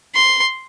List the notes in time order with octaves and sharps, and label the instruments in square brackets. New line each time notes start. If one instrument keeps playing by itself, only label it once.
[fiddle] C6